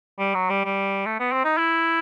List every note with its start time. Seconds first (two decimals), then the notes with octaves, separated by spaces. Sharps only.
0.19 G3
0.34 F#3
0.50 G3
0.65 G3
1.06 A3
1.20 B3
1.32 C4
1.44 D#4
1.58 E4